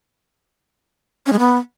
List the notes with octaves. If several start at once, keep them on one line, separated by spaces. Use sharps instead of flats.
C#4
G#3
B3